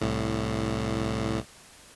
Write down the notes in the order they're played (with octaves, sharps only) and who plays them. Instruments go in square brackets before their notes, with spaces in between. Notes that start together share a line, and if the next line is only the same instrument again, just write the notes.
[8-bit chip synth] C2 A2